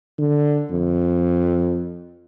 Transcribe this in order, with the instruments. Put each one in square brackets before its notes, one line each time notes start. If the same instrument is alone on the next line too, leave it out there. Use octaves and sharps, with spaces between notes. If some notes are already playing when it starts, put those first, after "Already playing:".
[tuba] D3
F2